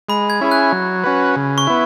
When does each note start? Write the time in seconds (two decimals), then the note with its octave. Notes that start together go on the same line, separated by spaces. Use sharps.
0.09 G#3 B5
0.30 G#6
0.41 C#4 E4 G#4
0.51 F#6
0.72 F#3
1.04 C#4 F#4 B4
1.36 C#3
1.58 C#6
1.67 B3 E4